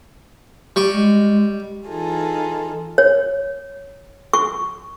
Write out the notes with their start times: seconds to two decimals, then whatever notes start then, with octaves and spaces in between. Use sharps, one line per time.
0.76 G3 C#6
0.92 G#3
1.87 E3 D#4 F4 G#4 A4
2.98 C#5
4.34 C#6